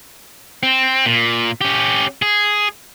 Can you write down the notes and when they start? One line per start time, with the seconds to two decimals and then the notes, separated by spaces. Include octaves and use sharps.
0.63 C4
1.06 A#2
1.61 C#4 G4
2.22 G#4